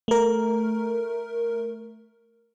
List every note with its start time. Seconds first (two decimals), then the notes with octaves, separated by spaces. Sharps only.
0.08 A3 A#4